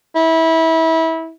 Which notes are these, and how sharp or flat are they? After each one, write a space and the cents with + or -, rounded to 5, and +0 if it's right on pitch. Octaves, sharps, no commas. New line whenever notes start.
E4 -25